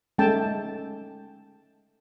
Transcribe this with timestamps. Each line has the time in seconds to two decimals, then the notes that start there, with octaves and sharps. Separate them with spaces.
0.18 G#3 A3 C#4 G5 A5